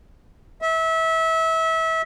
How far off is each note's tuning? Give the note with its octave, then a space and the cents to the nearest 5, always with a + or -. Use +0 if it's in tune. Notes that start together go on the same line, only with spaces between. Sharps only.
E5 -25